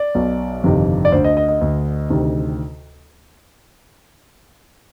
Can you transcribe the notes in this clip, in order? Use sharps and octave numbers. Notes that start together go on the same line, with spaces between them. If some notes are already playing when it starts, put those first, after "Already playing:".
Already playing: D5
B1 B2
G1 F2 C3 D#3
D5
D2 D3 C5
D#5
D#5
D#5
D2 D3
D2 C3 D#3